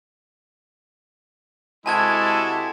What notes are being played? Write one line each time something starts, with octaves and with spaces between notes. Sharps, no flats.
C3 G#3 E4 F#4 A4 G#5 A5 G#6